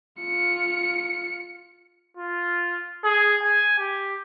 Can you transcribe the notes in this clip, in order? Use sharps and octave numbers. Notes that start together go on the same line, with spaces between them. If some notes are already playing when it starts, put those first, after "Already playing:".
F4 C#7
F4
G#4
G#5
G4